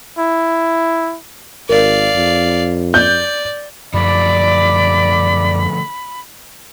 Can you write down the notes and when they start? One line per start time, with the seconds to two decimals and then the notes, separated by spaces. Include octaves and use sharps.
0.18 E4
1.69 G#1 A#4 D5 F5
2.16 F2
2.94 D5 G6
3.94 F#2 D3 F3 A3 D5 B5